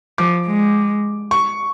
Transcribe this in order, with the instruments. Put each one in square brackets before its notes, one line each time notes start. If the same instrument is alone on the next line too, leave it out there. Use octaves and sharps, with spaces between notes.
[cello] F3 [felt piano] D6
[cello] G#3
[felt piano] C#6